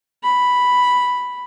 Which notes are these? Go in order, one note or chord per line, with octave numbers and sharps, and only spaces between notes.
B5